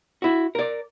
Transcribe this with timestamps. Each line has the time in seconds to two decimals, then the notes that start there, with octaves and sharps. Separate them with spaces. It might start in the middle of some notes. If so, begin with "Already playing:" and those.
0.22 E4 F#4
0.55 A#4 D5